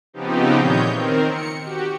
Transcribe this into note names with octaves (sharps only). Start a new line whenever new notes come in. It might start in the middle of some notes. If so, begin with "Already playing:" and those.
C#3 F3 B3 C4 D#4 G4
A#2 D#3 E3 C#5 D#5 G6
D#3 C4 A#4
C#7
F#4 G4